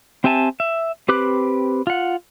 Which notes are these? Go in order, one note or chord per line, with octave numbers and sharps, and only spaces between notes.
C4 G4 E5 G#5 A5
E5
C4 G4 B4 D6 F#6
F4 F#5